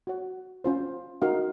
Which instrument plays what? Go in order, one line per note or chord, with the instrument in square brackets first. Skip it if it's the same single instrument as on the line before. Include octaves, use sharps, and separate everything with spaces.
[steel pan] F#4 C#5 F#5
C#4 F4 C5
D#4 F#4 A#4 F5